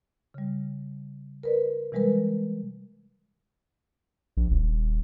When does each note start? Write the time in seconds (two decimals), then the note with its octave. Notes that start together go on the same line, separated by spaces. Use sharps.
0.34 C#3 G3
1.43 A#4 B4 D5
1.92 C3 E3 G3 G#3 A#4 B4
4.37 A#1
4.50 D#1